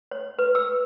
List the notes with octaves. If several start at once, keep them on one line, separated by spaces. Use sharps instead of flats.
C#5
B4
E6